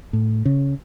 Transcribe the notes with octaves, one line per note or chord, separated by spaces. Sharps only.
A2
C#3